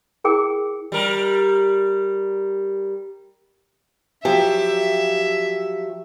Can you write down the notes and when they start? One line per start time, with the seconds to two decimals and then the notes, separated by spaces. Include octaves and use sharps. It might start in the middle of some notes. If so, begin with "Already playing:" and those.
0.24 E4 G#4 A#4 G5 D6
0.92 G3 A#4
4.25 F3 F#3 G4 E5